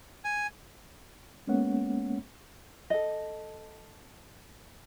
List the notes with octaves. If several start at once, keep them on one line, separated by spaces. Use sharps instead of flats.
G#5
G#3 A#3 B3 C#4 C#5 F#5
A4 D#5